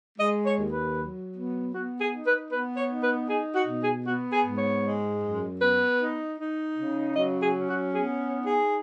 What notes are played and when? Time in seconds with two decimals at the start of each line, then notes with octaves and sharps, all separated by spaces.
0.18 G#3 D#5
0.45 C#5
0.58 D#2
0.71 B4
0.96 F#3
1.35 B3
1.73 B3 F#4
2.00 G#4
2.12 D#4
2.25 B4
2.51 B3 B4
2.77 C#5
2.90 D#4
3.02 B4
3.29 D#4 G#4
3.54 F#4
3.67 B2
3.80 G#4
4.06 B3 F#4
4.32 G#4
4.45 G#2
4.57 C#5
4.83 G#3
5.23 F#2
5.61 B3 B4
6.00 D#4
6.39 D#4
6.77 C#3
7.15 F#3 D#5
7.41 G#4
7.55 C#4
7.68 F#4
7.93 B3 G#4
8.32 D#4
8.44 G#4